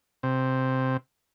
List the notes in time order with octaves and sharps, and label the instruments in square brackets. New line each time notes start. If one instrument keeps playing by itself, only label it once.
[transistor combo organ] C3